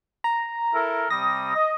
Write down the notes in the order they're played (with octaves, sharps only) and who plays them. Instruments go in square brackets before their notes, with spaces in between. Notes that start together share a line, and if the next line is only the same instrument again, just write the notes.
[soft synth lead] A#5
[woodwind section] E4 A4 A#4
[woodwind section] C3 G3 D#6 [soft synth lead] A#6
[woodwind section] D#5